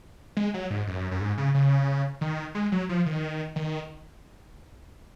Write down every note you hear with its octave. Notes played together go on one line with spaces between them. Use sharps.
G#3
F#3
G#2
F#2
F#2
G#2
C#3
C#3
D#3
G#3
F#3
F3
D#3
D#3